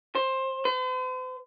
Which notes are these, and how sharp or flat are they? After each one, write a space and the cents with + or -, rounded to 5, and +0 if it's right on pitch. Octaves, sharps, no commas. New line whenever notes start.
C5 +15
C5 -45